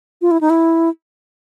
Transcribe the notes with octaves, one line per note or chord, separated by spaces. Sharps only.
F4
E4
D#4
E4